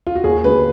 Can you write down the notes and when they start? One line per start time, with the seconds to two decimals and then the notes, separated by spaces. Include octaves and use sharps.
0.07 F4
0.15 F#4
0.24 D#2 G#4
0.44 D3 G#3 B4